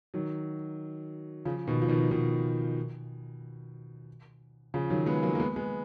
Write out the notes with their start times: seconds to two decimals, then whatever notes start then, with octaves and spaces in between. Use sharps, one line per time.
0.14 D#3 F#3
1.45 C#3 F3
1.67 B2 D#3
1.82 F3
1.89 B2 D#3
2.11 B2 D#3
4.74 C#3 F3
4.90 D#3 F#3
5.06 G#3 B3
5.22 F#3 A#3
5.35 A#3
5.40 G#3 B3
5.56 G#3 B3